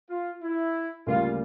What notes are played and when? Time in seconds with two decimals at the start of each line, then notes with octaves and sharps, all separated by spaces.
0.09 F4
0.42 E4
1.06 D2 C#3 G3 A#3 F4